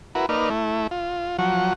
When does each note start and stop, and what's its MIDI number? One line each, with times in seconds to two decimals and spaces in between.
0.15 0.26 64
0.15 0.26 66
0.15 0.26 70
0.15 0.26 71
0.29 0.50 58
0.29 0.50 63
0.29 0.50 71
0.29 0.50 74
0.29 0.50 89
0.50 0.87 57
0.50 0.87 64
0.91 1.37 65
1.39 1.73 53
1.39 1.73 54
1.39 1.73 78
1.39 1.73 85